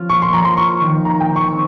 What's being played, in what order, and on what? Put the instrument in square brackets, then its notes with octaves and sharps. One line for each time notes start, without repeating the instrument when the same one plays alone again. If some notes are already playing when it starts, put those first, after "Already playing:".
Already playing: [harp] F3 C#4 F4
[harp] A#3 [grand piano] C#6
[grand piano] C6
[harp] F3 [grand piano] A#5
[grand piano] C6
[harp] F4 [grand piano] C#6
[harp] D#3
[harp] A#3 [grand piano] A#5
[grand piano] G5
[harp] D#3
[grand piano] C#6
[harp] C4